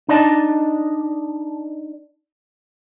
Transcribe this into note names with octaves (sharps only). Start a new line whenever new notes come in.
D4 D#4 D5 D#5 A5